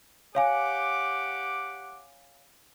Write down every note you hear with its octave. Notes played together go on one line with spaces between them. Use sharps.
G4 C#5 F5 F#5 G#5 D6